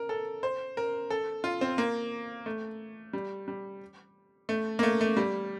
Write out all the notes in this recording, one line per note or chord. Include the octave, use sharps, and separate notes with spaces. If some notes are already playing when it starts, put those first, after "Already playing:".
Already playing: A#4
A4
C5
A#4
A4
F4
C4
A#3
A3
G3
G3
A3
A#3
A3
A3
G3